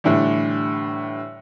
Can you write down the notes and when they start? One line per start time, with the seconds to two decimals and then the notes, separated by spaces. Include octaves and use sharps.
0.04 A2 D3 E3 G3